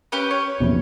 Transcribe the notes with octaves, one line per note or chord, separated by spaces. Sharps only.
C#4 G4 B4
C#5
A#1 E2 C3